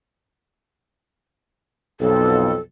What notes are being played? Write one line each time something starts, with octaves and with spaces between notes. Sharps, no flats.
B1 F2 A4